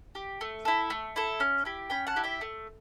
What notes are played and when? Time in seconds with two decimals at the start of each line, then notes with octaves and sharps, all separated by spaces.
0.15 G4
0.41 A3
0.65 E4 A4
0.90 A3
1.16 E4 A4
1.40 C#4
1.65 E4 G4
1.90 C#4 G5 B5
2.07 F#5 A5
2.16 E4 G4
2.24 E5 G5
2.41 A3